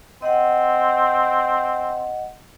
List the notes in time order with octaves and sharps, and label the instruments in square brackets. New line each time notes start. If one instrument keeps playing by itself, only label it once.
[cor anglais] C4 [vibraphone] D#5 F#5